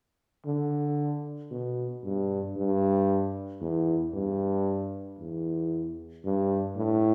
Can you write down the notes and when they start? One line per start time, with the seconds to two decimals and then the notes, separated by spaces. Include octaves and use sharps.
0.46 D3
1.51 B2
2.04 G2
2.56 G2
3.61 E2
4.14 G2
5.19 E2
6.25 G2
6.77 A2